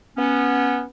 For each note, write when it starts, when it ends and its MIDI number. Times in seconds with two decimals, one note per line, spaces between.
0.17 0.84 59
0.17 0.84 61